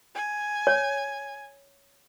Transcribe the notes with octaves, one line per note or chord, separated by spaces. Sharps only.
G#5
C#5